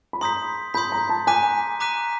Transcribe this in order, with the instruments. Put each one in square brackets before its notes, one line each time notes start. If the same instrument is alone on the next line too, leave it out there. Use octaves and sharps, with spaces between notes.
[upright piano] B5
[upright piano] A#5 [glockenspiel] C6 D#6 G6 B6
[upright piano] B5 [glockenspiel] C6 D#6 G6 B6
[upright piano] A#5
A5
[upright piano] G#5 [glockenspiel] A#5 D6 F#6 B6 D#7
[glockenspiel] A#5 D6 F#6 B6 D#7